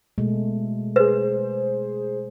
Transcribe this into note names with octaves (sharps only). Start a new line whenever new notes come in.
B2 G#3 A3
G#4 B4 C5